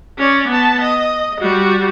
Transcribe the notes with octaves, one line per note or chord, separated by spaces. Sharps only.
C#4 D5
B3 A5
D#5
G3 F#4